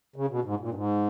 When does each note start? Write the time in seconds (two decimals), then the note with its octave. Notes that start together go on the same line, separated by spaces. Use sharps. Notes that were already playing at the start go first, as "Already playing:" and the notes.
0.16 C#3
0.30 B2
0.45 G#2
0.60 A#2
0.68 G2
0.74 G#2